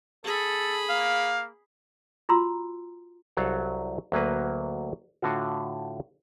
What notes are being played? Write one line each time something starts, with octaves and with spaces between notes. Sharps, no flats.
G#4 A4 B5
A#3 F5
F4 F#4 A#5 C6 E6
C2 F#3 A4 F5 F#5
D2 F#3 A#3 B4
A2 D3 F4 F#4